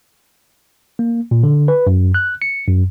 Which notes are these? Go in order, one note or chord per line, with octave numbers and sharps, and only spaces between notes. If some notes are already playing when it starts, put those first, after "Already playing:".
A#3
A#2
D3
B4
F#2
F#6
C#7
F#2